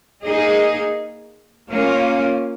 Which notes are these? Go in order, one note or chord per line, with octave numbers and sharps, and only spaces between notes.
A#3 D#4 G#4 D#5
A#3 C#4 F4